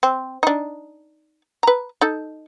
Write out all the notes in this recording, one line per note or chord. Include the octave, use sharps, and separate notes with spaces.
C4
D4 D#4
B4 A#5
D#4 A4